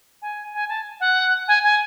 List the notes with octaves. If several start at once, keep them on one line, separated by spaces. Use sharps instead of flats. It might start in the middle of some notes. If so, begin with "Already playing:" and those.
G#5
G#5
A5
F#5
G#5
G#5